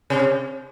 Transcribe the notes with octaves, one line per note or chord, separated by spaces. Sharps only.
C3